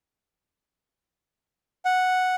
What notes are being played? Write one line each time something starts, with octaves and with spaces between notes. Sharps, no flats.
F#5